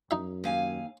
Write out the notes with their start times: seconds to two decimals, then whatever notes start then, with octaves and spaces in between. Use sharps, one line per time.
0.11 F#2 D#4 E5
0.44 D#2 F5 G#5